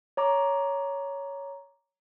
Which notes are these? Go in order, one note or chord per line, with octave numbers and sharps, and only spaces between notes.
C#5 A#5 D6